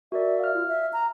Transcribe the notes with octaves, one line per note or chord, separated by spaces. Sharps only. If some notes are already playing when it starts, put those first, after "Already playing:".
F#4 A#4 D5 E5
F5 F6
F4
E5
A#5